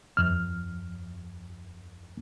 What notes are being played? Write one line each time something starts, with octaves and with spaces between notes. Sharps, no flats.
F2 F6